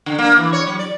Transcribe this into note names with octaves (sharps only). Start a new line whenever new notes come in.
D3
A#3
E3
C#5
F#3
D5